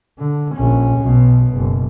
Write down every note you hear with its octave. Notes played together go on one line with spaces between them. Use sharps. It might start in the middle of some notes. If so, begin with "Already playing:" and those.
D3
A#1 C#4
B1 B2
F#1